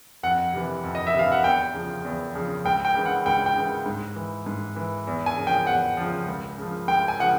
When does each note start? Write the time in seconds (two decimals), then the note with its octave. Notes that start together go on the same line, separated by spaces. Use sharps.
0.23 F2 F#5
0.53 C3 E3
0.84 F2
0.95 D#5
1.07 E5
1.14 C3 E3 F5
1.32 F#5
1.44 E2 G5
1.74 C#3 F3
2.04 E2
2.35 C#3 F3
2.65 C#2 G5
2.85 G5
2.95 C#3 E3
3.06 F#5
3.26 C#2 G5
3.46 G5
3.56 C#3 E3
3.86 G#2
4.16 E3
4.46 G#2
4.76 E3
5.07 E2
5.26 G#5
5.37 C#3 F3
5.47 G5
5.67 E2 F#5
5.97 C#3 F3
6.28 C#2
6.58 C#3 F3
6.88 C#2 G5
7.08 G#5
7.18 C#3 F3 F#5